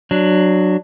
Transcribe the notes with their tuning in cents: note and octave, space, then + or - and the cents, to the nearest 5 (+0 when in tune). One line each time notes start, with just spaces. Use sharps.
F#3 +0 D4 +15